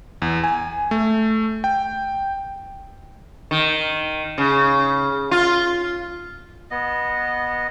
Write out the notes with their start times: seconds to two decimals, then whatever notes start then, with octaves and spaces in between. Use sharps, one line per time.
0.22 E2
0.44 G#5
0.91 A3
1.64 G5
3.51 D#3
4.38 C#3
5.31 F4
6.71 B3 D#5